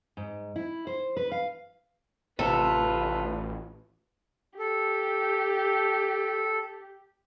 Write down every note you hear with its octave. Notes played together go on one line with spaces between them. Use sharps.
G#2
E4
C5
B4
F5
A1 C3 F4 A4 B4
G4 A4